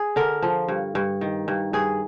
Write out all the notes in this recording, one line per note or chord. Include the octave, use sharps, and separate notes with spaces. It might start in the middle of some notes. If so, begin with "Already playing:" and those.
Already playing: G#4
D3 A#4
F3
G2
G2
D#3
G2
G2 G#4